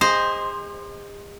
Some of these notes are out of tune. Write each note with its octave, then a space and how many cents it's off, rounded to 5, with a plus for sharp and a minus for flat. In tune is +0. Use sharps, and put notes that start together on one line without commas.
G#4 -45 C5 +0 D#5 +0